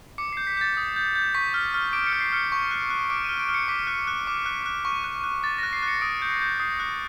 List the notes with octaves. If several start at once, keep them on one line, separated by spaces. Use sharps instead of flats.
D6 C#7
C7
G6
B6
G6 A6
D#6
G6
G6
C#6 B6
F6
F6
D6 D7
C#7
F6
C7
F6 C#7
C#6
F#6
F#6
D6 D7
D#7
F6
D7
F6
C#7
D6 B6
F#6
F#6
D6
F#6
F#6
C#6
F#6
F#6
D6 A6
A#6
F#6
C7
F#6 C#7
D#6 D7
G6
C7
G6
D#6 C7
F#6